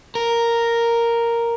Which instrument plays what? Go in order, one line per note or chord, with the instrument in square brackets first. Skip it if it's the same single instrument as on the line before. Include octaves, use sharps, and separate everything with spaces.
[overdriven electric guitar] A#4